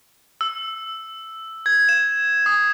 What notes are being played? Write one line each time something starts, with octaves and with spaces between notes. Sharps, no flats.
E6
G#6
E7
D#6